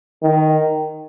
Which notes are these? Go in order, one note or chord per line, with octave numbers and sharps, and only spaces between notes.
D#3